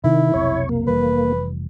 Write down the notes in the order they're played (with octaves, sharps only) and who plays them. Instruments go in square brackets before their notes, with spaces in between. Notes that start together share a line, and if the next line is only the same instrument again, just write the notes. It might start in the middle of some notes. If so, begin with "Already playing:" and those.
[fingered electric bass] C3 C4 [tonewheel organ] D#3 [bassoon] E4
[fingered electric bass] F1 B1 C3 [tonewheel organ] C#5
[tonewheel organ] A#3
[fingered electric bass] F1 E3 G3 [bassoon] B4